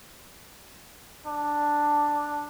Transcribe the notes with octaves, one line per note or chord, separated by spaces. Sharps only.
D4